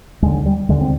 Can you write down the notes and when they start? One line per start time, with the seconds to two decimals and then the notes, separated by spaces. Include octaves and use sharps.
0.22 D#2 G#3
0.26 D3
0.46 G3
0.69 D#2 D3 G#3
0.81 C4